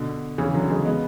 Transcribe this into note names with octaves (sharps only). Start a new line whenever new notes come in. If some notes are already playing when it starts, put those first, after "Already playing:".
Already playing: B2 D3
C#3 E3
D3 F#3
E3 G#3
G#3 B3